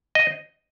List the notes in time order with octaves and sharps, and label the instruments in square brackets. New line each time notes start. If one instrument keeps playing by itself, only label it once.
[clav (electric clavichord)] D#5